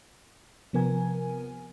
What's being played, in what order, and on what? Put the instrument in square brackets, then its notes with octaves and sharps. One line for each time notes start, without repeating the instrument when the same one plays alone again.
[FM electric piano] C3 F3 B3 A#4 G#5